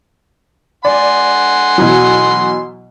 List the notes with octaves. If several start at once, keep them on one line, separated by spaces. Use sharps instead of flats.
D5 F#5 G#5 C6
B2 E3 F#3